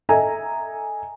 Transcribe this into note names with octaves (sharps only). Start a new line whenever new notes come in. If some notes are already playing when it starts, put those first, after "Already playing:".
A4 D#5 E5 G#5 A#5